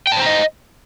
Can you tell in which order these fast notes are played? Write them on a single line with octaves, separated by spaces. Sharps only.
G5 A5 C5 A#5 D#5